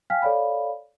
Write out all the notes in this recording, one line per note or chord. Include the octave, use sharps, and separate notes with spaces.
F5 G5 G#5 F6 B6
A4 C#5 D5 F5 B5